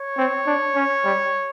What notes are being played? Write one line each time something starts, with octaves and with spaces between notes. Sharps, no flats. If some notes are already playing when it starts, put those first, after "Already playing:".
Already playing: C#5
C4
D4
C#4
G3